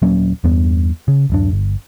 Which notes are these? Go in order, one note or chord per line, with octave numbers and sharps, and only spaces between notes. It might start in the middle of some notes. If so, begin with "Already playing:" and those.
D#1 F#3 A#3 C#4
E2 G2 B3
C#3
D1 F#2 D4
G1